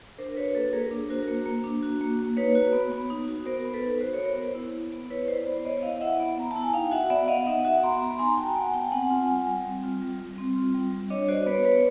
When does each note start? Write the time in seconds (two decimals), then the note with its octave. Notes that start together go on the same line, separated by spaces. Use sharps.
0.18 D4 A#4 C5
0.37 F#4 B4 C#5
0.55 A#3 A4 B4
0.73 A#3 G#4 A#4
0.91 D4
1.09 F#4 A#4 C5
1.28 A#3
1.46 A#3
1.64 D4
1.83 F#4
2.01 A#3
2.19 A#3
2.37 D#4 B4 C#5
2.55 F#4
2.73 B3
2.92 B3
3.10 D#4
3.28 F#4
3.46 B3 A#4 C5
3.65 B3
3.74 A4 B4
3.83 D#4
4.01 F#4 C5
4.13 C#5
4.19 B3
4.25 A#4 C5
4.37 B3
4.55 E4
4.73 B3
4.92 B3
5.10 E4 B4 C#5
5.28 E4 C5 D5
5.47 B3 C5 D5
5.65 B3 C#5 D#5
5.82 E4 D#5 F5
6.01 E4 E5 F#5
6.20 B3
6.38 B3 A#5
6.51 E4 A5
6.63 G#5
6.74 D#4 F5 G5
6.91 F#4 E5 F#5
7.10 B3 D5 E5
7.23 F#5
7.28 B3 D#5 F5
7.46 D#4 E5 F#5
7.65 F#4 E5 F#5
7.83 B3 A#5 C6
8.01 B3 A#5 C6
8.19 D#4 G#5 A#5
8.37 F#4 G5 A5
8.55 B3 F#5 G#5
8.67 G#5
8.73 B3 G5 A5
8.92 C4 F#5 G#5
9.10 F4
9.29 G3
9.47 G3
9.65 C4
9.84 F4
10.02 G3
10.19 G3
10.38 C4
10.56 F4
10.74 G3
10.92 G3
11.10 D4 C#5 D#5
11.28 F#4 C5 D5
11.46 B3 B4 C#5
11.65 B3 B4 C#5